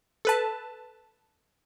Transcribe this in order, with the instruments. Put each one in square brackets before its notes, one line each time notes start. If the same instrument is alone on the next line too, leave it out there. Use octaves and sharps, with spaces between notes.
[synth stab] A4 B4 A5